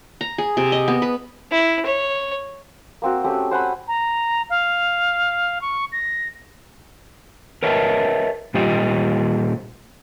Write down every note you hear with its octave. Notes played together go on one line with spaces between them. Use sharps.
A#5
G#4
C3
D#5
B3
B4
E4
C#5
A#3 C4 F#4
A3 C4 C#4 G4
C5 F#5 G#5 B5
A#5
F5
C#6
A#6
A#4 B4 C#5 D#5 E5 A5
A#2 G3 F4 G4 C5 D#5